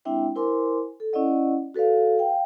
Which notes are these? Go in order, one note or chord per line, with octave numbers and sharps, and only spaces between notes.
G#3 C4 D4 E4 E5 G5
E4 A#4 C5 G#5 C6 D6
A4
C#4 E4 D5 D#5 F#5
F#4 A4 B4 D5 F5
F5 G5